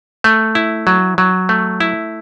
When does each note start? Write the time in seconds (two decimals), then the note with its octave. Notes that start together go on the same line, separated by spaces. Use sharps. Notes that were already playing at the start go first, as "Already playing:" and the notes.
0.24 A3
0.55 E4
0.87 F#3
1.18 F#3
1.49 A3
1.80 E4